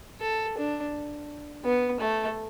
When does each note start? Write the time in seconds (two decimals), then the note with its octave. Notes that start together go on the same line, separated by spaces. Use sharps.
0.21 A4
0.58 D4
1.65 B3
2.01 A3